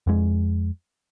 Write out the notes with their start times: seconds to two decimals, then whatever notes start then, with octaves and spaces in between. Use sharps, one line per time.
0.07 F2 G#3